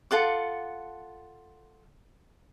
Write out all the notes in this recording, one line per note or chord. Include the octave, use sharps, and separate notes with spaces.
F4 A4 F#5 D6